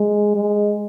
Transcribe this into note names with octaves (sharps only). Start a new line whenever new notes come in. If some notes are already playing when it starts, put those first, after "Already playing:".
Already playing: G#3
G#3